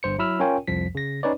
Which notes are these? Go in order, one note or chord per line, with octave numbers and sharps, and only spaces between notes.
G1 G2 C5 C#7
F#3 E4 B5 E6 F6
C#4 F4 A#4 C#5 G5 G#5
C2 F2 F3 B6
C#3 A#6
C#4 D#4 B4 C#5 D5